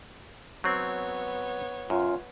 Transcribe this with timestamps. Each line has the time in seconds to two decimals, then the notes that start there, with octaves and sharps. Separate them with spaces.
0.64 F#3 B3 C4 C#5
1.90 F#2 F4